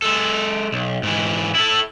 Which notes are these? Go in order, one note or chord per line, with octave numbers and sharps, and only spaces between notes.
G#3 A4
B1
G#2 E3
E4 A4